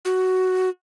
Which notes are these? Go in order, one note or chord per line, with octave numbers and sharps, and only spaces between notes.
F#4